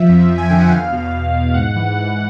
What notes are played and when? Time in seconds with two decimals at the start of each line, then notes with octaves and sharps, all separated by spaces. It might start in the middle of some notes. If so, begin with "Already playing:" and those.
Already playing: F3 E5
0.09 F2
0.29 F2
0.38 G#5
0.49 D3 G5
0.60 F#5
0.71 E2 F5
0.92 B2
1.14 E2
1.34 B2
1.54 G#2 F#5
1.76 E3
1.96 G#2